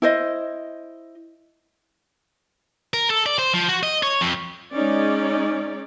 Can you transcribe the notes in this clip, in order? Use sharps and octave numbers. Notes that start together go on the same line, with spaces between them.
E4 C5 D#5
A#4
A4
D5
C5
F3
F#4
D#5
C#5
F2
G#3 C#4 D#4 D5